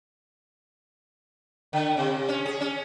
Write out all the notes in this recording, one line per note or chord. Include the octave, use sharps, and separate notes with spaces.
D3
C3
C#4
G#4
C#4